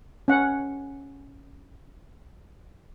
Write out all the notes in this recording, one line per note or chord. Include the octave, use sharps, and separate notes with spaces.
C#4 F#5